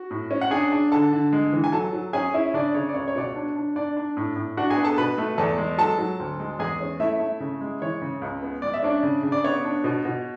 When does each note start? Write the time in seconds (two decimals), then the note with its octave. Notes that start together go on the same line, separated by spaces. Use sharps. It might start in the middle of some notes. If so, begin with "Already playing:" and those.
Already playing: F#4
0.11 A2
0.31 C#4
0.41 F#5
0.51 D4 G#4 G#5
0.72 D4
0.92 D3 A4 A5
1.13 D3
1.33 G#3
1.52 E3
1.64 G#5
1.72 F#3 A4 A5
1.93 F#3
2.13 C#4 G#4 G#5
2.34 C#4 E4 E5
2.54 C#3 D4 D5
2.74 C#3 C#5
2.89 D5
2.94 C#2 C#5
3.08 C#5
3.15 B2 D5
3.21 C#5
3.35 D4
3.56 D4
3.76 D4 D5
3.97 D4
4.17 A2
4.36 A2
4.57 D4 F#4 F#5
4.70 G#4 G#5
4.77 B3
4.84 A4 A5
4.98 B2 B4 B5
5.18 A3
5.38 E2 A4 A5
5.58 G#3
5.78 F#3 A4 A5
5.98 F#3
6.20 D2
6.40 G#3
6.59 E2 G#4 G#5
6.81 C#4
7.00 A3 E4 E5
7.20 A3
7.40 C#3
7.61 G#3
7.82 E3 C#5
8.02 C#3
8.22 C#2
8.43 B3
8.62 G#3 D5
8.74 E5
8.83 C#4 D4 D5
9.03 C#3
9.23 C#3
9.32 D5
9.44 B3 C#5
9.65 D4
9.84 B2
10.05 B2